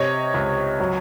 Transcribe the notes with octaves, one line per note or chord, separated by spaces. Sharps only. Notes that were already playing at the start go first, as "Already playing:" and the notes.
Already playing: C3 C#5 D#5
C#2
F#3